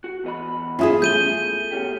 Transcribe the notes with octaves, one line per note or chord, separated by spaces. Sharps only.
F#4
E2 D#5 B5
C#4 E4 F4 G#4 E5 D#6
A3 G#4 G6 D#7 G7
B2 C#4 G4